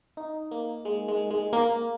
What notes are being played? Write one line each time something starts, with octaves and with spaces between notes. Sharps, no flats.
D#4
A#3
G#3
G#3
G#3
A#3